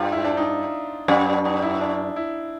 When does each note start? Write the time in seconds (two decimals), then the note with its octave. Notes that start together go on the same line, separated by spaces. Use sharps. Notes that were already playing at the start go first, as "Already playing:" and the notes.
Already playing: G2 F4
0.12 E4
0.25 D4
0.37 D#4
1.08 F#2 D4
1.27 D4
1.44 D#4
1.62 E4
1.81 D4
2.16 E4